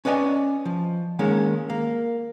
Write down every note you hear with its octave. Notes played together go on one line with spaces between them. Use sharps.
C#4 B4 D5 D#5 G#5
F3
D#3 G#3 A#3 C#4
A#3